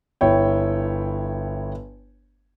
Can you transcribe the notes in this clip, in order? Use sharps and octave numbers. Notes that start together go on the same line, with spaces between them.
G1 E4 C#5 G5